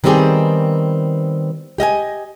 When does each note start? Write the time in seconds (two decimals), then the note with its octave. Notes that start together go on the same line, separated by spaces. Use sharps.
0.04 D#3 G3 B3 C4 G4 G#4
1.78 G4 D#5 F5 G#5